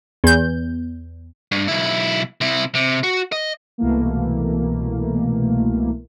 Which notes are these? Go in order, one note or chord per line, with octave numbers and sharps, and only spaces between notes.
E2 G6
G2
B1 E4
C3 E4
C3
F#4
D#5
C2 B2 E3 A3 A#3